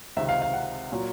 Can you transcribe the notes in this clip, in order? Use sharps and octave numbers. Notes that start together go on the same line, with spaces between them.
C#2 C3 D#3 E5
F5
F5
F#5
A#2 F#3